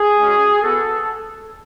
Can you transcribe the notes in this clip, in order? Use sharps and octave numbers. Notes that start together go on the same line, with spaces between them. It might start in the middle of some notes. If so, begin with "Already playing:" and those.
Already playing: G#4
G#3 C#4 F#4
B3 F#4 A4